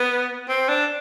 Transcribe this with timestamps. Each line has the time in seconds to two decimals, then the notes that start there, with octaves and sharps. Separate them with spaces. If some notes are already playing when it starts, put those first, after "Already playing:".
Already playing: B3
0.48 C4
0.69 D4